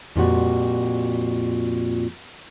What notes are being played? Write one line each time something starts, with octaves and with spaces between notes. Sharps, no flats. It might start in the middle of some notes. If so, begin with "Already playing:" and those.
F2 A#2 G3 F#4